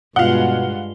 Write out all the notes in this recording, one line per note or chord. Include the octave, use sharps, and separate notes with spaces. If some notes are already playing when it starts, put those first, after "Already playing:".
G2 B2 G#3 F4 F5 F#5 G7